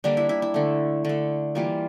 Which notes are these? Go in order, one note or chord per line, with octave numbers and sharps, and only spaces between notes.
D3 G3 A#3 D4
E4
E4
E4
D3 A3
D3 A3
E3 G3 A#3 F4